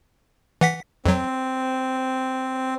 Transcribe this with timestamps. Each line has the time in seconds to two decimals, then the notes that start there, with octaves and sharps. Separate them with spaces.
0.61 E3 F#5 B6
1.06 F2 F#3 C4